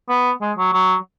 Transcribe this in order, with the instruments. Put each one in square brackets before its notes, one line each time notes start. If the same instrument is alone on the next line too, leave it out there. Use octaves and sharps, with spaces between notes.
[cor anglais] B3
G#3
F#3
F#3